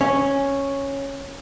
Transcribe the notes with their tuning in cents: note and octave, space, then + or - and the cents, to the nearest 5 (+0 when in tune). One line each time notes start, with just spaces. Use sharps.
C#4 -5